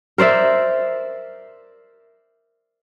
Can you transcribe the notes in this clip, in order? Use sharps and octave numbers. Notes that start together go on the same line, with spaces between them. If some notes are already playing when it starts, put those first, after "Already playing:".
A#4 C5 D5 E5